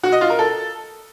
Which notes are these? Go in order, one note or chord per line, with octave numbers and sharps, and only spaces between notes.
F#4
D#5
F4
A#4
A4